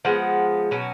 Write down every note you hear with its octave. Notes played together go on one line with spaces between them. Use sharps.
F3 G#3 B3 F#5
B2 F#3 C#4